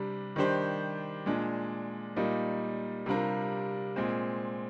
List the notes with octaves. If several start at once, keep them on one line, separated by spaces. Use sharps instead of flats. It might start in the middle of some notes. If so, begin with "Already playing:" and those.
Already playing: C3 G3 D4
D#3 G3 D4 G4 C5
A#2 G#3 D4
A#2 G3 A#3 D#4
C3 G3 D4 F4 A#4
A#2 G#3 C4